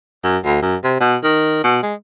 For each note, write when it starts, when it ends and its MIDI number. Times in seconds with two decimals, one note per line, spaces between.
0.24 0.38 42
0.45 0.58 38
0.62 0.76 42
0.84 0.95 48
1.00 1.16 47
1.24 1.62 51
1.64 1.80 47
1.83 1.94 56